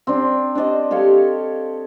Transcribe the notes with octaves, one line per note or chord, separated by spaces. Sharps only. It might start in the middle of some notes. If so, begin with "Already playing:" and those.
C4 D4
D4 C5 D5 D#5
G4 A4 C#5 F5